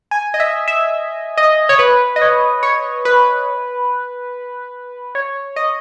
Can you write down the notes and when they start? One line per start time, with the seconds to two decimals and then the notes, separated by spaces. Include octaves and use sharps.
0.11 G#5
0.34 D#5
0.40 E5
0.68 E5
1.37 D#5
1.69 C#5
1.79 B4
2.16 D#5
2.22 C#5
2.63 C#5
3.05 B4
5.15 C#5
5.56 D#5